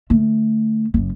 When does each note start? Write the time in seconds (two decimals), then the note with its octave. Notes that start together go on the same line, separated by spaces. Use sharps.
0.10 D3 A3
0.94 F#1 F#2